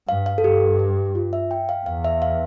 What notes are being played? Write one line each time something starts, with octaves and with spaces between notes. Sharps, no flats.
G2 F5
F5
A4
G2 G4
G4
F4
E5
G5
F5
E2 F5
E5
F5